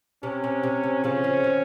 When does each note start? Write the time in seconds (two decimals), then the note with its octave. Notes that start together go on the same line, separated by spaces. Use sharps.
0.23 C3 C#4
0.44 C3
0.63 C3
0.83 C3
1.04 C#3 F3 C#4
1.24 C#3 F3
1.44 D#3 F#3